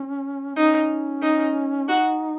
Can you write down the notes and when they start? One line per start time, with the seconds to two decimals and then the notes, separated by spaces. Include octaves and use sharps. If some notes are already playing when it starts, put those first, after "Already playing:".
Already playing: C#4
0.56 C#4 D#4
1.22 D#4
1.88 D#4 F#4